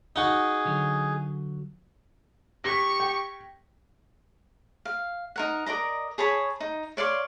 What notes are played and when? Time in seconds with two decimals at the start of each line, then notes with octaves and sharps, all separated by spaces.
0.16 D#4 F#4 G#4
0.65 D3 F#3
2.64 G4 C#6 A#6 B6
3.00 G5
4.85 F5
5.36 D#4 A#4 F#5
5.66 A#4 D5 D#5 A#5
6.18 G#4 C#5 A5 B5
6.60 D#4
6.97 C#5 D5 F5 C6